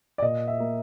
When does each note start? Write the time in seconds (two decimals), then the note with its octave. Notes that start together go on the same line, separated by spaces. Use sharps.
0.18 D5
0.22 A#2 D#5
0.48 E5
0.60 A#3